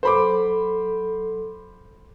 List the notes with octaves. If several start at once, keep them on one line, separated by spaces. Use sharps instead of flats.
F#3 A4 C5 B5 D6